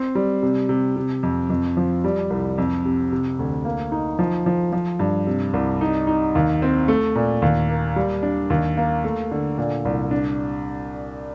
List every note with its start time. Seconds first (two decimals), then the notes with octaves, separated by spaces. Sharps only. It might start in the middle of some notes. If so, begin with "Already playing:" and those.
Already playing: C4
0.15 G3
0.43 C3
0.69 C3
0.96 C3
1.23 F2
1.50 F2
1.77 F3
2.04 G3
2.30 C2
2.58 F2
2.85 C3
3.12 C3
3.39 D2
3.65 A#3
3.92 D#4
4.19 F3
4.46 F3
4.73 F3
5.00 G2
5.27 C3
5.53 C2
5.81 D#4
6.07 D#4
6.35 D#2
6.62 C4
6.88 A3
7.15 A#2
7.42 D#2
7.69 A#3
7.96 G3
8.23 D4
8.50 D#2
8.77 A#3
9.04 A3
9.31 D3
9.58 A#2
9.85 C2
10.11 D4